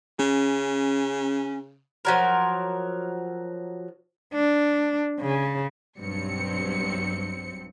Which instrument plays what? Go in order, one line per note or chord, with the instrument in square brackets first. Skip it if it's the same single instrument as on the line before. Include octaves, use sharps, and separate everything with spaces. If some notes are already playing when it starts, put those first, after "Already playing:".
[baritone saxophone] C#3 [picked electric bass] C#4
[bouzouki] F3 F#3 A#4
[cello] D4
C#3
[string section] B1 G2 F#3 C4 C#7